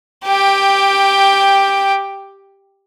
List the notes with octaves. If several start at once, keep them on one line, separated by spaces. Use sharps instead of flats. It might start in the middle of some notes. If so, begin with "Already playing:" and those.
G4 G5